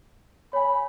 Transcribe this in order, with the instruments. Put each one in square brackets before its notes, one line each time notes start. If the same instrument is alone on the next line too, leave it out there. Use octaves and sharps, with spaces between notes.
[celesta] C#5 G#5 [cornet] B5